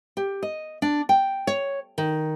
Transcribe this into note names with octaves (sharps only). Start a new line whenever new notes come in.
G4
D#5
D4
G5
C#5
D#3